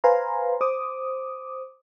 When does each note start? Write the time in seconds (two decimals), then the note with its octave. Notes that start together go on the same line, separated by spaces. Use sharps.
0.04 B4 C5 F5 G#5 A#5 C6
0.61 C5 D6 D#6